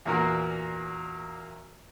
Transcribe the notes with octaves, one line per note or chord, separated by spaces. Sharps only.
E2 A#2 A#3 F#4 A#4 F5